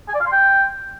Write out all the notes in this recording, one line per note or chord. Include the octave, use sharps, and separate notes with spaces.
G#5
D5
F5
C6
G5